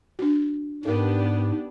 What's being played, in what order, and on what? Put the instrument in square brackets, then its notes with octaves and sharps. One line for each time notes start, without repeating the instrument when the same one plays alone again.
[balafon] D4 F#4
[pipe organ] G#2 [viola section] B3 D4 G4 [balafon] A4 A#4